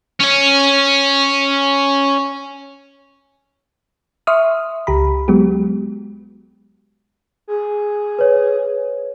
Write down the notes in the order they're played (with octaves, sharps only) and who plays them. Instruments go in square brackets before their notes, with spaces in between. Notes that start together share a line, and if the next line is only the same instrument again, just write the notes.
[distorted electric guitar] C#4 C#5
[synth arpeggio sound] E5 C6 C#6 D#6 F6
C#2 G4 A#5 B5
F#3 G#3 B3 F#4 G4
[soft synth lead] G#4
[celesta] B4 C#5